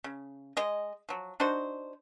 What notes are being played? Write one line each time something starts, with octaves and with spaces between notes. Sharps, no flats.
C#3
G#3 D#5
F3 F#3
D4 D#4 F#4 C5